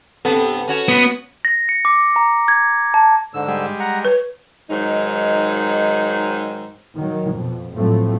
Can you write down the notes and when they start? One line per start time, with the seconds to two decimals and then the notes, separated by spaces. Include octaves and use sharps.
0.25 G2 C3 B3 A4
0.68 C#4 F#4 C#5
0.88 B3
1.45 A#6
1.69 C#7
1.85 D6
2.16 A#5
2.48 G#6
2.94 A5
3.34 G#2 D3 E6
3.48 G3 G#3
3.80 F#5 A#5
4.05 B4 C#5
4.70 G#2 D#3 F#3 D#4
6.96 D#3 F#3
7.33 F2 B2
7.75 A1 A2 F3 F#3 A3 C4